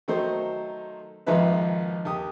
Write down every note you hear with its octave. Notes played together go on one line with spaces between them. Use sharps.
D#3 F#3 A3 D#4 A4 C5
G#1 F2 F3 D#4 B4 E5
D#2 G4 D#6